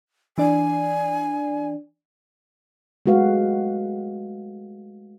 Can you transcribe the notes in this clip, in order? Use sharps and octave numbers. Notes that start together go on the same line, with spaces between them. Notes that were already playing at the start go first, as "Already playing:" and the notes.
E3 D4 D5 G#5
G#3 A3 F#4 B4 F5